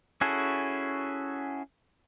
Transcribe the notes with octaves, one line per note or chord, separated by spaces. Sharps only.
C#4 E4 F#4 G#4 A4